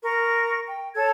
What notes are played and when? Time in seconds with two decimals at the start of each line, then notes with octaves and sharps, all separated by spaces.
0.04 A#4 C#6
0.68 G5
0.96 A4 C#5 A5 G#6